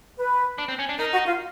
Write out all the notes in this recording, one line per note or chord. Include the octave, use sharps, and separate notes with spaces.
B4
D4
C4
C#4
D4
D#4 A#4
F#4
F4